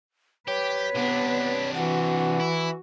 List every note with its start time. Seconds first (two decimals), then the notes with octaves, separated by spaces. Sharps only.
0.48 G4 B4 C#5
0.95 C3 B3 D4
1.75 E3 F#4 F#5
2.40 E4